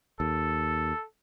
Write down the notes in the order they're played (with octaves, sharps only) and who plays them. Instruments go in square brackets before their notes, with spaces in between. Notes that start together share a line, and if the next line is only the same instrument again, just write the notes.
[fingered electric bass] D#2 [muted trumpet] A4